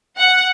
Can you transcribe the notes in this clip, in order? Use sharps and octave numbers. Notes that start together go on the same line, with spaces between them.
F#5